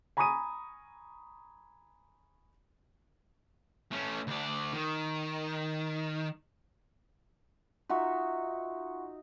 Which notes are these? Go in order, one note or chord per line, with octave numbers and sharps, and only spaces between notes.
G#5 A#5 B5 C#6 D#6 D#7
A3 C#4
D2 D5
D#3
D#4 F4 F#4 E5 F#5 C#6